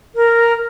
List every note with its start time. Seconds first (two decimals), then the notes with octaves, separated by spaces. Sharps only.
0.15 A#4